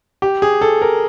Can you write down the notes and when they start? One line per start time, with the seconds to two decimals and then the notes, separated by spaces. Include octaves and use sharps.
0.22 G4
0.42 G#4
0.61 A4
0.82 A#4